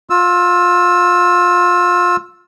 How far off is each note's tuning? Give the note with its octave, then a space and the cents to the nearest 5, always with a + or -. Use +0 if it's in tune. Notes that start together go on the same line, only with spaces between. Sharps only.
F4 +25 E6 +0